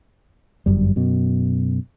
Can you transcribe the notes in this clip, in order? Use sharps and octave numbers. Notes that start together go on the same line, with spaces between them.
G1 F#2 G3
F#2 B2